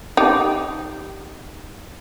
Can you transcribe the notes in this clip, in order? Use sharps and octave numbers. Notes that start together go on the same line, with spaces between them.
D#4 G4